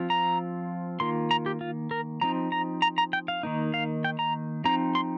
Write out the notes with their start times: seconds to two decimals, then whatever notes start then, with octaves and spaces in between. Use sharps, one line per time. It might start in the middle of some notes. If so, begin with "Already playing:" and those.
Already playing: F3 C4 F4
0.10 A#5
1.00 D#3 A#3 F4 C6
1.31 A#5
1.46 G4
1.61 F4
1.91 A#4
2.21 F3 C4 D#4 A#5
2.52 A#5
2.82 A#5
2.98 A#5
3.13 G5
3.28 F5
3.43 D#3 A#3 D#4
3.74 F5
4.04 G5
4.19 A#5
4.64 F3 C4 D#4 A#5
4.95 C6